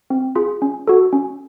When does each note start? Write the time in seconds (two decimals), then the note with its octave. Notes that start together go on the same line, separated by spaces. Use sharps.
0.10 C4
0.35 F4 G#4
0.62 C#4
0.87 F#4 A4
1.13 C#4